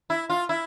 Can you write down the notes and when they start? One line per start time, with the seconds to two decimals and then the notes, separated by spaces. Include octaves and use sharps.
0.10 E4
0.30 F4
0.49 E4